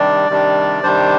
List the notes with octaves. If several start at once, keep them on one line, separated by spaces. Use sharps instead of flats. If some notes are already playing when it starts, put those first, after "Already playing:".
Already playing: C3 D#3 G3 D4 D5
C3 D#3 G3 D4
C3 D#3 G3 D4 C5